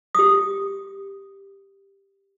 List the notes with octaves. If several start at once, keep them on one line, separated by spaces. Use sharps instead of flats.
G4 D#6